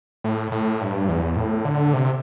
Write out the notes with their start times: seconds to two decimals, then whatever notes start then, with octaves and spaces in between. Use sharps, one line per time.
0.24 A2
0.52 A2
0.81 G2
1.09 E2
1.36 A2
1.65 D3
1.93 C3